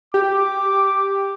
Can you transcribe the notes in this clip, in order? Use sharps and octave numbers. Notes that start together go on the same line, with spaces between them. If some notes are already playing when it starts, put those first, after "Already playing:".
G4 D6